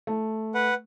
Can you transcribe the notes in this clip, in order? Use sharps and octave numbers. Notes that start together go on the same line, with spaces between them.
A3
B4 F#5